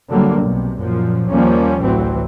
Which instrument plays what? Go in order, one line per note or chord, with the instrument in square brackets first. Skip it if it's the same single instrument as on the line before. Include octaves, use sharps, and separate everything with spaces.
[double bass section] D3 F#3 G3 A#3
B1 C3
F#2 A#2 F3
D#2 F3 G3 A#3 C#4
A1 D2 E3 F#3 C4